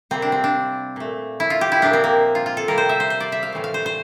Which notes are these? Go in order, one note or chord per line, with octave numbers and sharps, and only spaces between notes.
C3 G3 A#3 C4
D4
C4
D4
A#2 A3
E4
F4
G4
E4
A#2 F3 A#3 D4
C4
A#3
F4
F4
A4
C3 G3 A#3 A#4
C5
E5
C5
C5
D5
E5
F5
A2 E3 A3
F5
C5
C5